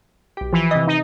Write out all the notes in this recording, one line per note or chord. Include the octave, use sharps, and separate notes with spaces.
B1 G4
E3 F3
C3 D#5
D#4